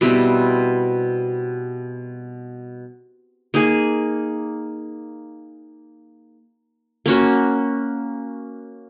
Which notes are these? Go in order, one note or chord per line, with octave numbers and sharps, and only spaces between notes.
B2 G3 C4 E4
A#3 D#4 G#4
A#3 C#4 F#4